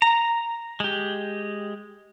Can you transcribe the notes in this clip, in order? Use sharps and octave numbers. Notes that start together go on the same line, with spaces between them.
A#5
G#3 G4